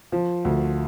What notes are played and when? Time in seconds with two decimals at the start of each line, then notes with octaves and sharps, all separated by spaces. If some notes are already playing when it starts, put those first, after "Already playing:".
0.12 F3
0.45 D2